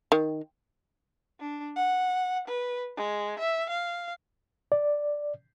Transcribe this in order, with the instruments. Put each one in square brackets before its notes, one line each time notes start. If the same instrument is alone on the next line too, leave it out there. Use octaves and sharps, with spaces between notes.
[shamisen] D#3
[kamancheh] D4
F#5
B4
G#3
E5
F5
[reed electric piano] D5